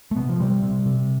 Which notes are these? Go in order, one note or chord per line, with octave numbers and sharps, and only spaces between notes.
A3
C3 B3
F3
C3 G3
C3
C3